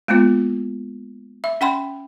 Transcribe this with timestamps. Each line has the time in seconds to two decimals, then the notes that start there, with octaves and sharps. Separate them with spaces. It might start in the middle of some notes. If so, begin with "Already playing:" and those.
0.08 G#3 A#3 B3 F4
1.44 E5
1.61 C#4 F#5 G5 B5 C6